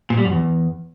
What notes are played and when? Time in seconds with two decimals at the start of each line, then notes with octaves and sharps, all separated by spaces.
0.10 A#2
0.17 G3
0.25 F#2
0.32 E2